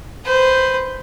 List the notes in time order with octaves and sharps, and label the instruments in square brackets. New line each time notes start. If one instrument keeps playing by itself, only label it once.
[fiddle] B4 C5